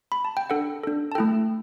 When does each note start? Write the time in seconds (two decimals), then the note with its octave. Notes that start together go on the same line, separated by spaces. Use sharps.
0.12 B5
0.25 A5
0.37 G5
0.50 D4 A4 F#5
0.84 D4 A4
1.12 A5
1.15 A3 E4 A4 G5